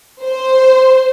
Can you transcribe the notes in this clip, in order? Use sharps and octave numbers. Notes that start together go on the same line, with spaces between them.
C5